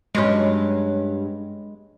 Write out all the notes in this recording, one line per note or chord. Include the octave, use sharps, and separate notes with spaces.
G2 F#3 G#3 C#4